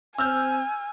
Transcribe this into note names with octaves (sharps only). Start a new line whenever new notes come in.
C4 G#5 E6 F6 G6